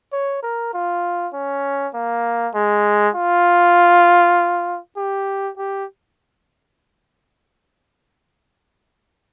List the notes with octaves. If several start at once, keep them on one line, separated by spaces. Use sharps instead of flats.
C#5
A#4
F4
C#4
A#3
G#3
F4
G4
G4